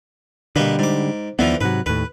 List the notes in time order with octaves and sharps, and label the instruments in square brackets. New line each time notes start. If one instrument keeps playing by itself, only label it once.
[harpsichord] B2 A#3 B4 [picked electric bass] D3 G3
[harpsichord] G#2 D6
[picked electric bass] D#2 B3 [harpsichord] D3 E3 F3
[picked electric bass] G#2 C3 F#3 [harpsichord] B4
[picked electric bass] D#2 A2 [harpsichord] B4